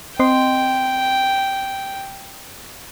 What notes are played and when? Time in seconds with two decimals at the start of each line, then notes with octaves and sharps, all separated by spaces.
0.20 C4 D#5 G5 C6